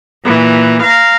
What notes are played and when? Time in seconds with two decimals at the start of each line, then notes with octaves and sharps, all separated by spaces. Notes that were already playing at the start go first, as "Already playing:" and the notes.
0.23 A#2 E3
0.82 F5 A#5